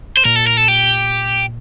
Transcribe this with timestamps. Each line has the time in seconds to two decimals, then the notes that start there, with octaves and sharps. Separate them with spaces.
0.17 C5
0.25 A#2 A#4
0.36 A4
0.47 A#4
0.57 A4
0.68 G4